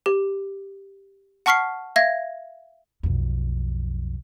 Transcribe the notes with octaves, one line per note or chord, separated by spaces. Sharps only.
G4
F#5 A5 C#6 F6 B6 C7
E5 F5 G#6 A#6
B1 F2